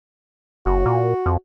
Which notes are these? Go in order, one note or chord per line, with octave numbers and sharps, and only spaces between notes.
F#1 F#4
A#2
F2